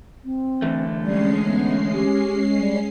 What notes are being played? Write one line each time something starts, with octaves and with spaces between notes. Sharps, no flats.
C4
D3 E3 A3
G3 G#3 C#4 C7
B3
G4
G3